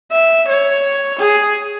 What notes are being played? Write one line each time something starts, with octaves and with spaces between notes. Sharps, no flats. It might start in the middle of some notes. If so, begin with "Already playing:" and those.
E5
C#5
G#4